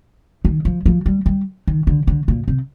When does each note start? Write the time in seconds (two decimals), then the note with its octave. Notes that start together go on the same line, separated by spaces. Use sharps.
0.45 D#3
0.65 F3
0.86 F3
1.06 G3
1.26 G3
1.67 D#3
1.87 D3
2.07 D3
2.28 A#2
2.48 C3